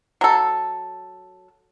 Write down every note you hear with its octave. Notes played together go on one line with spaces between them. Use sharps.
F#3 A4